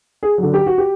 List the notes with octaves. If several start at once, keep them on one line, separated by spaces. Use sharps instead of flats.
G#4
D3 F#3
G4
F#4
G4